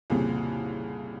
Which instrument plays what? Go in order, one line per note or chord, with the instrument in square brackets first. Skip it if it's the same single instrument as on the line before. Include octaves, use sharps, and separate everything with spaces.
[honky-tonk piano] C2 F2 A#2 C#3